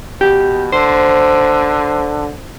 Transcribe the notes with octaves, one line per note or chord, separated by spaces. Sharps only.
B2 G4
D3 C5